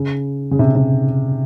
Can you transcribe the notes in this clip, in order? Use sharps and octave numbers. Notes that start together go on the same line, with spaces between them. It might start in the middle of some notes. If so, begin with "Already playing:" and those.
Already playing: C#3
C#3
C3
C3